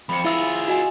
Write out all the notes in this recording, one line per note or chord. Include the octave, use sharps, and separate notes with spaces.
F2 B5 C#7
E4 F4 G#4 E5 E6
F#4 D#5 G#5